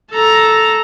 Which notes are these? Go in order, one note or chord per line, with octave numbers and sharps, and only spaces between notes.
A4 A#5